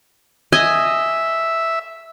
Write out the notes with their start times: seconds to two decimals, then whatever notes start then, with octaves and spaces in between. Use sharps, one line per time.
0.52 D#5 E5 G#5